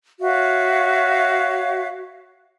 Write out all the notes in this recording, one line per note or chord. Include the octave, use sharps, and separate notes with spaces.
F#4 C#5 E5 F5